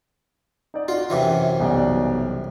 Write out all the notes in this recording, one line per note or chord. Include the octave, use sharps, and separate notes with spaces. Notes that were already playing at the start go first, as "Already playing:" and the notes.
D#4 D5
F4 F#4
F#2 C3 E3
B1 G3 D5